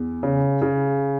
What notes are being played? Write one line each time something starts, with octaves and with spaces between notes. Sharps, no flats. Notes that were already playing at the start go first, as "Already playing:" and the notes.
Already playing: E2
C#3
C#3